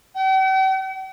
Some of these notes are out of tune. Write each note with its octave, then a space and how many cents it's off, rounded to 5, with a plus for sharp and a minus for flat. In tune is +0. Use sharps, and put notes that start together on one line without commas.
G5 -45